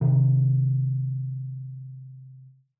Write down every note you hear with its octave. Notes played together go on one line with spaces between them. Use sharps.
C3 D#3